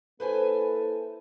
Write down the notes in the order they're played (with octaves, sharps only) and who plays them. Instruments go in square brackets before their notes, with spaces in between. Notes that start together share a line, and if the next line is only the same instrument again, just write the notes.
[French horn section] A#3 E4 A4 [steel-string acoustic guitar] B4 C5 G#5